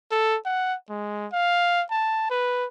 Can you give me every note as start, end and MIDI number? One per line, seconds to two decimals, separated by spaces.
0.12 0.37 69
0.45 0.75 78
0.90 1.27 56
1.32 1.83 77
1.91 2.26 81
2.30 2.67 71